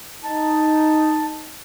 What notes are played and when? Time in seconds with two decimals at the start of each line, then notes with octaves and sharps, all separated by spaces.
0.23 D#4 A5